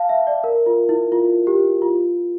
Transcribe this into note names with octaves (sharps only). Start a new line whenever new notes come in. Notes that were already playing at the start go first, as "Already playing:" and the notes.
Already playing: F5 A5
E5
D5
A#4
F4
E4
F4
G4
F4